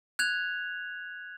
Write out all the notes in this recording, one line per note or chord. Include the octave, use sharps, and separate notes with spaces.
F#6 G#6 F7